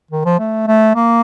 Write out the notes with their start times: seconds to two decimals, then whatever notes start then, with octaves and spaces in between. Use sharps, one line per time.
0.11 D#3
0.25 F3
0.39 A3
0.67 A3
0.96 A#3